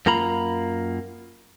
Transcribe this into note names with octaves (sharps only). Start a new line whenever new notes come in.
F#2 A#3 F4 A#5 B5